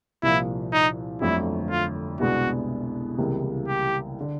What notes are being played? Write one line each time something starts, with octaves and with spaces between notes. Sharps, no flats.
C2 A#2 F3 E4
D#4
G1 F2 D3 F#3 A3 E4
F4
C2 B2 G#3 B3 D4 F#4
C#2 C3 E3 G3 A#3
G4
D3